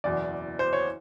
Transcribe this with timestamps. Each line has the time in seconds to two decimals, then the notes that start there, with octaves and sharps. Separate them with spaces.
0.04 F#1 E2 B2 D5
0.59 C5
0.73 C#5